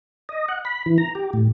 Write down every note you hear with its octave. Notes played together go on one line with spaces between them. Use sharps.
D#5
F#5
B5
E3
A#5
G4
A2